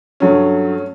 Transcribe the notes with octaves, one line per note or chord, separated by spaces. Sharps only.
G2 F#3 A3 C#4